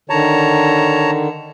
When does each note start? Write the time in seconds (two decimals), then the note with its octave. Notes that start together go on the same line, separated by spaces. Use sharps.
0.10 D3 D#3 C#5 A5 A#5